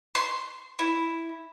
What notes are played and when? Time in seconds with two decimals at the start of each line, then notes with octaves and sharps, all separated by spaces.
0.15 C6
0.79 E4